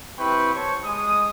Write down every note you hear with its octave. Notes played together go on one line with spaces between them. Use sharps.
C4 E4 G4 B4 G5 C#6
C5 C#5 A5 C#6
G#3 D#6